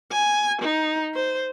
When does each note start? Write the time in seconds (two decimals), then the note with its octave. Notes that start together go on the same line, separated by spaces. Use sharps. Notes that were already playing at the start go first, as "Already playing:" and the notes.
0.11 G#5
0.62 D#4
1.14 C5